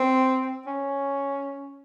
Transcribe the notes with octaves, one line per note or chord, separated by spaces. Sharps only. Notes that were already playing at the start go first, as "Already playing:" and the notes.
Already playing: C4
C#4